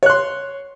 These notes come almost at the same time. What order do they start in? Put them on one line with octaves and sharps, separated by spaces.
C#5 F#6 C6